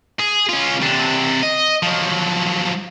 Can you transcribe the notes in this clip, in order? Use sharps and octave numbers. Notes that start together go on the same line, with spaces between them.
G#4
C#4 F4
C3 D4
D#5
F3 F#3